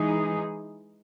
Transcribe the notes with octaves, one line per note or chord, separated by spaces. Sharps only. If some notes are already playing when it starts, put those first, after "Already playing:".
Already playing: E3 G#3 D#4 G#4